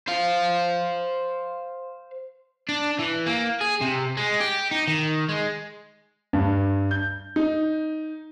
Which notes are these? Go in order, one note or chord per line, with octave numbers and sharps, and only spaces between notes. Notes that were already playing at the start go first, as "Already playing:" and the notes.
C5 F5
D4
E3
A#3
G#4
C3
G#3
G4
D#4
D#3
G#3
G2
G6
D#4